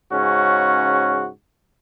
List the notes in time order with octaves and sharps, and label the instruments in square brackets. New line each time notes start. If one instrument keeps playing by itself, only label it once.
[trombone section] G#2 C#3 C#4 F#4